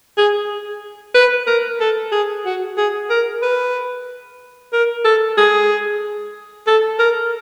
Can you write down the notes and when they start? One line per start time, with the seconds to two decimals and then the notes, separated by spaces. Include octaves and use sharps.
0.17 G#4
1.15 B4
1.47 A#4
1.80 A4
2.12 G#4
2.45 F#4
2.77 G#4
3.10 A#4
3.42 B4
4.73 A#4
5.05 A4
5.37 G#4
6.67 A4
6.99 A#4